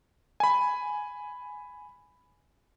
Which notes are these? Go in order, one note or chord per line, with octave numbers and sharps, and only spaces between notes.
G#5 B5